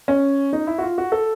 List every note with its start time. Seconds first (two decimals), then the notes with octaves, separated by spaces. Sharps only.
0.08 C#4
0.53 D#4
0.67 E4
0.78 F#4
0.83 F4
0.98 F#4
1.12 A4